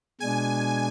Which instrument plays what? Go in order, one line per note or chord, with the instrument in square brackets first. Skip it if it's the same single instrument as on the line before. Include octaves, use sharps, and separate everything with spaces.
[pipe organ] B2 G#3 D4 [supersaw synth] G#5